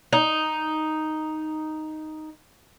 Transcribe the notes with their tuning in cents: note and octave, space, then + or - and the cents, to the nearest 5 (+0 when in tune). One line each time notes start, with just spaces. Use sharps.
D#4 +0